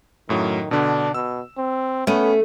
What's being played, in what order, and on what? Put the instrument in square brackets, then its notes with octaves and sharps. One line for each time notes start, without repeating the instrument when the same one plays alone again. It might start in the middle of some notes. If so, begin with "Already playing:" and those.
[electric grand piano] F#2 A2 F#3 [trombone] D#3
[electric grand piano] B2 D3 [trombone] D4
[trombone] B2 [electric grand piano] E6
[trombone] C4
[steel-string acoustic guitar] A3 [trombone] B3 [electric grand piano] C#4 D#7